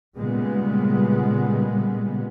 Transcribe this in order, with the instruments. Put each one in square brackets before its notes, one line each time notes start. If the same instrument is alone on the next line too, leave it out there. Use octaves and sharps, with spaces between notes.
[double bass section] A#2 C#3 G3 G#3 B3